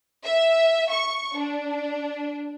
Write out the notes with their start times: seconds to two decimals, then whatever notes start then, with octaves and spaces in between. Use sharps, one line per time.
0.24 E5
0.91 C#6
1.37 D4